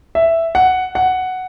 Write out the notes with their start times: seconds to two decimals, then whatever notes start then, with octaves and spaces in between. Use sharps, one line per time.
0.15 E5
0.55 F#5
0.95 F#5